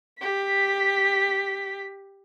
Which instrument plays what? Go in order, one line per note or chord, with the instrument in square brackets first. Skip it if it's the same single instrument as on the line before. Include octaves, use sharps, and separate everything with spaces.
[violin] G4 B6